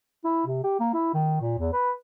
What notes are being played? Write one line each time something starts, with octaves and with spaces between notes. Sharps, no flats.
E4
C3
G4
A#3
E4
D#3
A#2
E2
B4